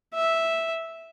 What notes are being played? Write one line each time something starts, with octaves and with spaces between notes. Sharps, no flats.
E5